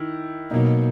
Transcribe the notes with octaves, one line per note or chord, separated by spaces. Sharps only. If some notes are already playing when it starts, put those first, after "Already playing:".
Already playing: D#3 E4
B2 F#3 A#3 D#4